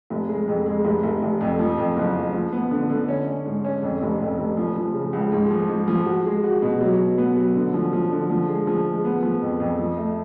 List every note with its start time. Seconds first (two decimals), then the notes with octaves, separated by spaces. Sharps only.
0.10 F1
0.29 G#3
0.48 F2
0.66 G#3
0.85 F1
1.03 F1
1.22 F1
1.41 F2
1.59 F3
1.78 F2
1.97 F#1
2.15 F#1
2.34 F3
2.52 B3
2.71 D3
2.90 D3
3.08 C#4
3.27 C#4
3.46 G#2
3.64 C#4
3.83 F2
4.02 F1
4.20 F2
4.39 F1
4.57 F3
4.76 F3
4.94 C#3
5.13 C#2
5.32 G#2
5.51 F3
5.69 G#2
5.88 F3
6.06 F#4
6.25 G#3
6.44 F#4
6.62 B2
6.81 F#3
6.99 B2
7.18 B3
7.37 F#3
7.55 D3
7.74 F3
7.93 F3
8.11 D3
8.30 F3
8.48 G#3
8.67 F3
8.86 G#3
9.05 B3
9.23 F3
9.42 F2
9.60 F2
9.79 F3
9.97 A3